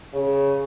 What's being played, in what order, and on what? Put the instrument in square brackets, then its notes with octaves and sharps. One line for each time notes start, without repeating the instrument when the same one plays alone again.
[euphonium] C#3